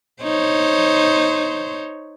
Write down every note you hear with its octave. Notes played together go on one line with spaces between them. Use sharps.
D#4 C5 C#5